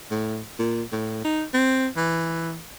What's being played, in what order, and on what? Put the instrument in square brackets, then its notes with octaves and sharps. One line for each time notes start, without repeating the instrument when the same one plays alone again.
[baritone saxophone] A2
A#2
A2
D#4
C4
E3